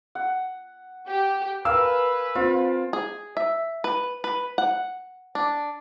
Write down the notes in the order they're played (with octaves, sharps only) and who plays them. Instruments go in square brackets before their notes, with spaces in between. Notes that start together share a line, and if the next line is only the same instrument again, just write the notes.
[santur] F#5
[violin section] G4
[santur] A#4 G#5 [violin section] B4 [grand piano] F5 E6 F6
[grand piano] C4 [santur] F4
[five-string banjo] G#4
E5
B4
B4
F#5
D4